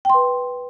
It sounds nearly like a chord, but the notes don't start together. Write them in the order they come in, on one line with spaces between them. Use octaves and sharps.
G5 C6 B4